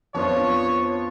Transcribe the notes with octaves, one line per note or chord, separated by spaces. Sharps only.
F2 F3 B3 D4 F4 C#5